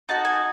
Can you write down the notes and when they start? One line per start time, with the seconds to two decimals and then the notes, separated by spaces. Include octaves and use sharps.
0.09 D#4 F#4 A5
0.25 G#5